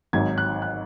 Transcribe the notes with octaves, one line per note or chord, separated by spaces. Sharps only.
G#1 G#2 F#3 G#6
F#6
F#6